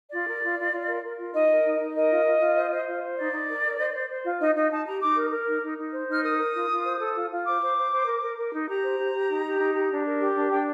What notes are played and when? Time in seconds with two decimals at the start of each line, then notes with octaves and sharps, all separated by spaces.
0.12 F4 D5
0.27 A#4
0.42 F4
0.58 F4
0.73 F4
0.88 A#4
1.03 A#4
1.18 F4
1.34 D#4 D#5
1.49 A#4
1.64 D#4
1.80 D#4
1.95 A#4 D#5
2.11 F4
2.26 F4
2.41 F4
2.56 C5
2.71 C5
2.87 F4
3.03 C5
3.17 D#4 D5
3.33 D#4
3.48 A#4
3.64 A#4
3.78 C5
3.93 C5
4.09 C5
4.25 F4
4.39 D#4 D#5
4.55 D#4 D#5
4.71 D#4 A5
4.86 G4 A#5
5.01 D#4 D6
5.17 A#4
5.31 A#4
5.47 D#4
5.62 D#4
5.78 D#4
5.93 C5
6.08 D#4 F6
6.23 A#4 D#6
6.38 A#4
6.55 F4
6.70 F4
6.85 C5
6.99 A4
7.15 F4
7.31 F4
7.45 C5 D6
7.61 C5
7.76 C5
7.92 C5
8.06 A#4
8.22 A#4
8.37 A#4
8.53 D#4
8.68 G4 A#5
8.84 C5
8.99 G4
9.13 G4
9.29 D#4
9.45 G4
9.60 D#4
9.75 G4
9.91 D4
10.06 A#4
10.21 G4
10.36 D4
10.51 D4 G5